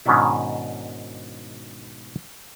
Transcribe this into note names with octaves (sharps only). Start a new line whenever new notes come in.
G#2 B2 D#3 C#4 D4 E4